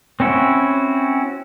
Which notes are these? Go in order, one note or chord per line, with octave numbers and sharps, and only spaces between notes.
C4 C#4 E4 F#4